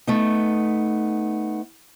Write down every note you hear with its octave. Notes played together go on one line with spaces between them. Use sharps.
A3 B3 D#4